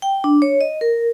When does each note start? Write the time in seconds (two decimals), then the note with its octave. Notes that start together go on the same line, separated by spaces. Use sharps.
0.02 G5
0.24 D4
0.42 C#5
0.61 D#5
0.81 A#4